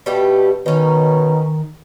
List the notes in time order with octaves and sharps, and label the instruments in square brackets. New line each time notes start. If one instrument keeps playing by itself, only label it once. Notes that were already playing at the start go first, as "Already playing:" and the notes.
[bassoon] B2 [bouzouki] G3 A3 G4
[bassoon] B2 [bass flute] D#3 [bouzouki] C#4 D#4